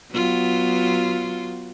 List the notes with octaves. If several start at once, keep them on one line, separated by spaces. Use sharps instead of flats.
F#3 B3 F4